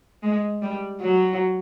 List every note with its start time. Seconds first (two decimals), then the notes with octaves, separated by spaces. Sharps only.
0.23 G#3
0.62 G3
1.01 F#3